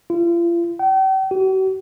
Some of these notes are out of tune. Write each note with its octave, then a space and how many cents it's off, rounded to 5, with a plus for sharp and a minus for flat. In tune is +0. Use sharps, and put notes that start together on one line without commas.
F4 -40
G5 -40
F#4 +45